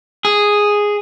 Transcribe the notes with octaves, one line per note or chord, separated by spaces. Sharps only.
G#4